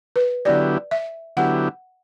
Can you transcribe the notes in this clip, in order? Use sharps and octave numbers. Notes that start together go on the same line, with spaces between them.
B4
D3 F#3 B3 E4 G4 D5
E5
D3 F#3 B3 E4 G4 F#5